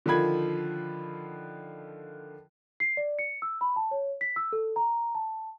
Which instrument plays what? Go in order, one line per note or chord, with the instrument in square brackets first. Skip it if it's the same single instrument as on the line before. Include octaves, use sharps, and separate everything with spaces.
[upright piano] D3 D#3 F3 F4 B5 G#6
[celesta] C7
D5
C#7
E6
B5
A5
C#5
B6
E6
A4
A#5
A5